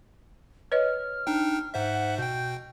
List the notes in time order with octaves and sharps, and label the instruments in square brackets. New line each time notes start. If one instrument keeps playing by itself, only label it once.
[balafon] B4 C#5 D#5 [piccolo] F6
[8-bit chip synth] D4 D#4 G5
[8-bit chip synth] G#2 C5 E5 [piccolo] F#5
[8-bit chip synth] B2 G5 [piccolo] G6